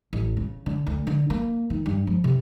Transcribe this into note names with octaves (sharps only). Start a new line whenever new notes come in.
A1
C#3
D3
D2
D3
A#3
D#3
G2
F3
C3